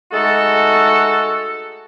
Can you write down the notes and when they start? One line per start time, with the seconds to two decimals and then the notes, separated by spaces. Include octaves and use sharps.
0.12 G#3 A3 D#4 F#4 A4